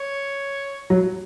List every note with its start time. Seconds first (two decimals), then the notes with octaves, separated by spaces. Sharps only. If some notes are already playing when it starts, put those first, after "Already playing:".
Already playing: C#5
0.90 F#3